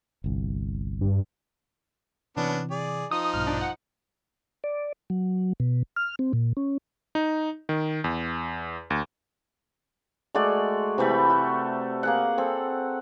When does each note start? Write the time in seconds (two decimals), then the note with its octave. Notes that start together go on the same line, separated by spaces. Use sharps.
0.24 G1 C2
1.01 G2
2.37 C3 E3 B3 C#4 D4
2.71 G#4 D5
3.11 F3 D#4 D#6
3.34 A#1 G2 B2 F6
3.47 D4
3.61 F#5
4.64 D5
5.10 F#3
5.60 B2
5.96 F6
6.19 C4
6.33 A#2
6.57 C#4
7.15 D#4
7.69 D#3
8.04 E2
8.90 D2
10.35 G#3 A3 F#4 D5
10.98 C3 E3 A3 B5
11.30 F#4
12.03 A#3 G#4 F#5
12.38 C4 A4